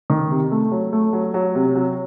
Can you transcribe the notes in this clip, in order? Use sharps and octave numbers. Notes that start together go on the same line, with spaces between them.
D#3
C3
A3
F#3
A3
F#3
F#3
C3
F#3